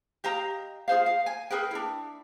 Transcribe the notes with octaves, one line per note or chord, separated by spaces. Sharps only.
G4 D#5 F5 A#5
F4 G#4 C5 F5
F5
G#5
G#4 A#4 B4 G5
D4 E4